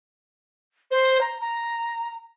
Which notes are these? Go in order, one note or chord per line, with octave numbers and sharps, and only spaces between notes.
C5
A#5
A#5